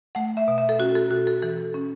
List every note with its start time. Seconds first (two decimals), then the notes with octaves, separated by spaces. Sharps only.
0.15 A3 F#5
0.37 E5
0.48 B2
0.58 E5
0.69 A4
0.79 C#4 F#4
0.95 A4
1.10 B2 F#4
1.27 A4
1.42 E3 A4
1.74 C#4